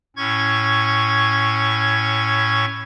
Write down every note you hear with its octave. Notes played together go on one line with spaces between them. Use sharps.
A2 C#4 C#6 G#6